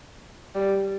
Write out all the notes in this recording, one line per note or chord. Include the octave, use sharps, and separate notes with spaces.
G3